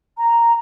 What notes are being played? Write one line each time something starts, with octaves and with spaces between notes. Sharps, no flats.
A#5